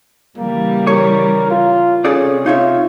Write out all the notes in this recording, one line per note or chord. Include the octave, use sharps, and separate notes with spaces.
C#3 E3 G3 A#3
A#4 C#5
F4
C3 C#4 G#4 A4 D5
D#4 F4 C#5 E5